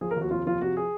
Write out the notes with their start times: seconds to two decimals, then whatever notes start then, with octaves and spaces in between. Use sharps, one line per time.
0.01 F3 G#4
0.11 A#4
0.16 D#2 F#4
0.31 F1 F4
0.46 F3 F4
0.61 C3 F#4
0.77 G#4